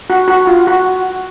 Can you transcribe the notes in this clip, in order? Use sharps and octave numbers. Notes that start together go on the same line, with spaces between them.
F#4
F#4
F4
F#4